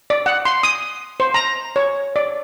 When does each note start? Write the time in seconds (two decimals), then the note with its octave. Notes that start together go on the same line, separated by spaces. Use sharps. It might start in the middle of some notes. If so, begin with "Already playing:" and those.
0.10 D5
0.26 F#5
0.45 C6
0.63 D#6
1.20 C5
1.34 A#5
1.76 C#5
2.16 D5